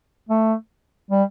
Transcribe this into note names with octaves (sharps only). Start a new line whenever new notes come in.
A3
G3